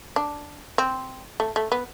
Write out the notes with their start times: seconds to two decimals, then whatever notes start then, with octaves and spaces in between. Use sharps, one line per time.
0.16 D4
0.78 C4
1.40 A3
1.56 A3
1.72 B3